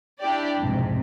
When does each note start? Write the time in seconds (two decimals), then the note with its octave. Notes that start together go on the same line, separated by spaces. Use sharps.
0.21 D4 E4 G4 D5
0.61 B1 F2 G#2 C3